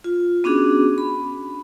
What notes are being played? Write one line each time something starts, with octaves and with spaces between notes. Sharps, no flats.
F4
B3 C#4 D4 F#4 G#4
B5